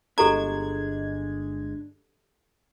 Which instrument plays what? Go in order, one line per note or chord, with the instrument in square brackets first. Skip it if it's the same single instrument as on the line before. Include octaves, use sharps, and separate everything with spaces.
[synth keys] G1 G#3 G#6 [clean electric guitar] D4 [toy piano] G4 A4 A#5